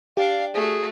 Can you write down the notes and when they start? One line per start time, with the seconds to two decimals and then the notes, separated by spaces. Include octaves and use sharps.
0.17 D4 G4 D5 F5
0.54 A3 F#4 G#4